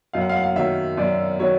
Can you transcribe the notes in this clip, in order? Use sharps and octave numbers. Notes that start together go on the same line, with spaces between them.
F#2 F5
F#5
F5
F#5
F5
D#3 F#3 E5
F#2 D5
D#3 F#3 C#5